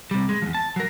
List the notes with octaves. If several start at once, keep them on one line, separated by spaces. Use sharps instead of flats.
C3 G3
G#3
E2 F3
A5
F#3 A#4